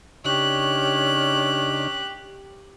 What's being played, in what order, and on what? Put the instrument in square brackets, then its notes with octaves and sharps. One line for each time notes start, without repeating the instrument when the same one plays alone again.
[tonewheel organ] C#3 D4 D#4 [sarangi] G4 [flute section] C#5 C#6 F6 [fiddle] F#6